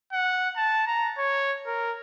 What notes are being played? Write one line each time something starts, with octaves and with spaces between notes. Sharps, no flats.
F#5
A5
A#5
C#5
A#4